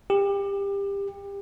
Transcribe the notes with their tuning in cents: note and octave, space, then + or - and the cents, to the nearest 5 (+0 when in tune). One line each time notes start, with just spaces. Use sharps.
G4 +25